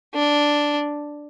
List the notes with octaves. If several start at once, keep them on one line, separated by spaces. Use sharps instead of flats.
D4